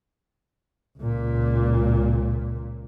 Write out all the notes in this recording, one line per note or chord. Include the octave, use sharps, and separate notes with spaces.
C#2 A#2